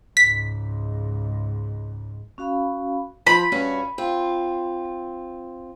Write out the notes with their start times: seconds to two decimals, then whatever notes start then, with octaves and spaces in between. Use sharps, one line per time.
0.17 C#2 G#2 B6
2.38 C#4 F#4 F5 B5
3.27 F3 B5
3.52 G2 C#4 F#4
3.98 C4 F4